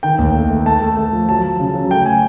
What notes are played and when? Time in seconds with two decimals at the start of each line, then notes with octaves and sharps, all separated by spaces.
0.03 D#3 G5
0.19 D#2
0.35 A3
0.50 A3
0.66 A3 A5
0.82 A3
0.97 A3
1.13 F3
1.29 F#3 A5
1.44 F#3
1.60 C#3
1.75 F#3
1.90 A3 G5
2.06 G#5